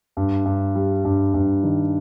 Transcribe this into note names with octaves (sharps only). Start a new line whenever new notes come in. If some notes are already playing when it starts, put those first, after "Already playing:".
G2
G2
G3
G2
G2
D#3